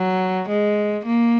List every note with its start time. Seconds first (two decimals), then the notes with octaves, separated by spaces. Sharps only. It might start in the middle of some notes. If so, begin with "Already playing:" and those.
Already playing: F#3
0.48 G#3
1.05 A#3